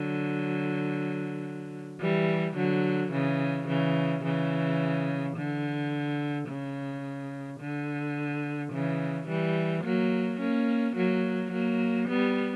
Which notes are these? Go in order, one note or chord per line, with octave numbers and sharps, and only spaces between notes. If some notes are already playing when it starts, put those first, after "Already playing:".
Already playing: D3 F#3
E3 G3
D3 F#3
C#3 E3
C#3 E3
C#3 E3
D3
C#3
D3
C#3 E3
E3 G3
F#3 A#3
A#3 C#4
F#3 A#3
F#3 A#3
G3 B3